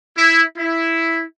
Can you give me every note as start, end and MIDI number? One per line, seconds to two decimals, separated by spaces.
0.18 0.44 64
0.57 1.25 64